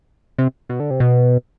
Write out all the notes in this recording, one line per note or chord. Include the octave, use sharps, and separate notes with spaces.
C3
B2
D3
C3
B2